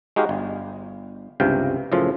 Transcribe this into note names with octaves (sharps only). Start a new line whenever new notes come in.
G#3 D#4 F#4 G4 F5
G1
G1 C#2 G2 C3 F5 G5
F#2 A2 C#3 F3 F4